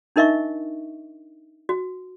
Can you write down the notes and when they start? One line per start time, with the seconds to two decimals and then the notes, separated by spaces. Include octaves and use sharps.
0.16 D4 D#4 A#4 D#5 E5 C#6
1.69 F#4